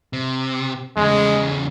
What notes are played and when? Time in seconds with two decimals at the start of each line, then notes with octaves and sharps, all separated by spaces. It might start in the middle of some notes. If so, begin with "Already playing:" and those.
0.13 C3
0.97 E2 C#3 G#3